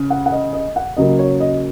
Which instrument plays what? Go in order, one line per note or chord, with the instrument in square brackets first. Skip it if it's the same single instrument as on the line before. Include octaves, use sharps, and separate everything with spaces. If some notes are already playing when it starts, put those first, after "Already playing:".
Already playing: [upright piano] C#3
F#5
F#5
D#5
D#5
F#5
C#3 F#3 A#3 D#5
C#5
D#5